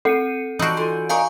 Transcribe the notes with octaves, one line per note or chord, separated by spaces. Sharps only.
C4 A4 F#5 C#7 D#7
E3 F3 G3 D#4 F#4 G6
D3 F4 G#5
D4 D#4 A#4 F5 G#5 C#6